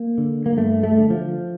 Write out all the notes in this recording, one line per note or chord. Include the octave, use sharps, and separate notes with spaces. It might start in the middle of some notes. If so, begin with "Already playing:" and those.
Already playing: A#3
D3
A#3
G2 A3
A3
D3
F3